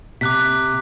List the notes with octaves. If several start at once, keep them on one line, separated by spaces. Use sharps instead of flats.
C3 D6 F#6 B6